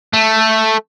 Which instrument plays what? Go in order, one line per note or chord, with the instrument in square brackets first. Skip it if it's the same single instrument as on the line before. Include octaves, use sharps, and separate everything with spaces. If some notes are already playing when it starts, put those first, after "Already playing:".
[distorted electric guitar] A3